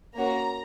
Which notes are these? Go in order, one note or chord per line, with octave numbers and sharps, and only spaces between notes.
A#3 C#4 F#4 A#5